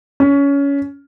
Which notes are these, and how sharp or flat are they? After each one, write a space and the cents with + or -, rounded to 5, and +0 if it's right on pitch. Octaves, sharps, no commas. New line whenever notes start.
C#4 +20